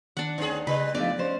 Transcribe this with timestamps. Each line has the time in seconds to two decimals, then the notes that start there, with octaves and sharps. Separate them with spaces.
0.17 D#3 D4 F#5 F#6 C#7
0.38 D2 B3 C#4 D#4 G#4
0.67 C#3 G3 B4
0.95 F3 A3 B3 D4 D#4 D5
1.19 C#4 C5